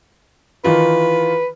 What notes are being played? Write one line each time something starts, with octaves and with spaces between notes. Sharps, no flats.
D#3 E3 F4 B4